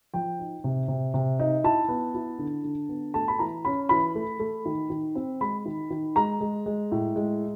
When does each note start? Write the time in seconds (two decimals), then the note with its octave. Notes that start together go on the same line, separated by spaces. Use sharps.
0.14 F3 G5
0.39 D#4
0.64 C3
0.88 C3
1.14 C3
1.39 D#4
1.64 E4 A5
1.88 B3
2.15 E4
2.39 D3
2.64 D3
2.89 B3
3.14 A3 A5
3.28 B5
3.39 E3 A#5
3.65 C#4 B5
3.89 E3 B5
4.15 A3
4.39 A3
4.65 D#3
4.90 D#3
5.15 C4
5.41 G#3 B5
5.65 D#3
5.90 D#3
6.16 G#3 A#5
6.41 G#3
6.66 G#3
6.92 A2
7.16 G#3